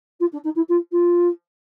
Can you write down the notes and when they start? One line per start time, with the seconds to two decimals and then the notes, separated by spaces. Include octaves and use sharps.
0.20 F4
0.32 D4
0.44 D#4
0.55 E4
0.68 F4
0.92 F4